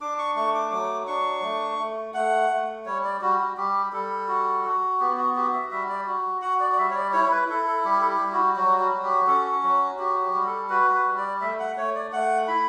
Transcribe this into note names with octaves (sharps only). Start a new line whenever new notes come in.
D4 D6
C#6
A3 C#6
D6
F#3 D6
D4 C#6
A3
A3
A3 F#5
A3
G3 C#5
D5
G3 F#4
F#4
G3 G4
G3 A4
F#4
F#4
B3 G4
F#4
F#4 G4
E5
G3 E5
D5
F#4
F#4 F#5
D5
D5
G3 E5
C#5
D5
E4 C#5
B4
E4 A4
A4
G3 G4
A4
G4
G3
F#4
F#3 F#4
F#4
F#4
G4
C#4 A4
F#3 F#4
F#4 G4
G4
G3
A4
F#4 B4
B4
G3
D5
A3 E5
F#5
A3 C#5
D5
A3 F#5
E4 B5